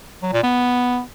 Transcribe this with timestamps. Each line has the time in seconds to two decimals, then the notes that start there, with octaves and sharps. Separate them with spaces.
0.22 F#3
0.33 A#2
0.43 B3